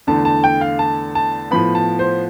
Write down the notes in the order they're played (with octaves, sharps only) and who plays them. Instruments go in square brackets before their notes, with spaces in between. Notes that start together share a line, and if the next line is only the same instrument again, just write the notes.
[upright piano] E2 D3 A3 A5
A5
G5
F5
A5
A5
A2 F3 B3 B5
A5
C5